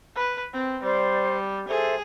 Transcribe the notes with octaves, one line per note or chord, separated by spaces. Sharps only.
B4
C4
G3 C5 D5
G#4 A4 C5 E5